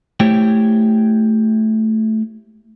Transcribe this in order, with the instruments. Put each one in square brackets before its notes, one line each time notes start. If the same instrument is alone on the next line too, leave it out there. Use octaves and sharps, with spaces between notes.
[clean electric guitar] A3 E4 G4 C5 C#5 G5